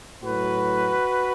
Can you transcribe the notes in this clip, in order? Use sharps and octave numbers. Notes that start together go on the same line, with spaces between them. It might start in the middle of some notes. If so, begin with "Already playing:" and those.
A2 F#3 F#4 B4